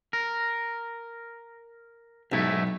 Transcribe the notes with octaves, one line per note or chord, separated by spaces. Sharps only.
A#4
B1 G#2 A3 E4